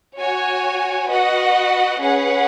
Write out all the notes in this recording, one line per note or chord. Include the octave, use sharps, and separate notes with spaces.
F#4 C#5 G#5
F#4 B4 D#5 F#5
C#4 G#4 B4 F#5